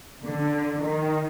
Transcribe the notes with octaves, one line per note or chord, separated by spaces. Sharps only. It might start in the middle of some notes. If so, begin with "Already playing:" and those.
D3
D#3